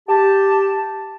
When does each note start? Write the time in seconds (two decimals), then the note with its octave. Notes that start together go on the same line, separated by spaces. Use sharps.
0.09 G4 A5